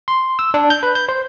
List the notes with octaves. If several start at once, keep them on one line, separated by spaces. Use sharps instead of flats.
C6
E6
D4
G6
B4
G6
C5